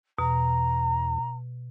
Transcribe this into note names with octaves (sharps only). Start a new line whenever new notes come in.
E2 B2 A#5